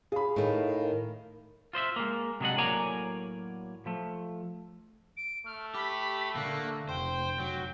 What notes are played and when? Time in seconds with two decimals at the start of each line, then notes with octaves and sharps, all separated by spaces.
0.12 G#4 F5 B5
0.36 A2 D#3
0.79 A#4
1.73 F4 C5 D#5 E5
1.96 G#3 A#3
2.40 C3 F#3 G#3 D4 D#5 F#5
2.57 A2 F#3 A#3 D5 G#5 A#5
3.86 F3 A3
5.17 D7
5.46 A3 F6
5.75 G4 B5
6.36 D3 A#3 F#6
6.89 F1 C5 G5
7.40 F#3